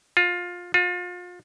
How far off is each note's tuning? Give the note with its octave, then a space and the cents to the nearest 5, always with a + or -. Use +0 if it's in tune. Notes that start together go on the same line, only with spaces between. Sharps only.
F4 +20
F4 +35